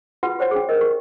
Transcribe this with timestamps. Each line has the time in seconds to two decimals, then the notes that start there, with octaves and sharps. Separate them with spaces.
0.23 F4 F#4 G#4 B4 F#5
0.39 G4 C5 C#5 F#5
0.51 D4 G#4
0.69 A#4 D#5
0.81 G4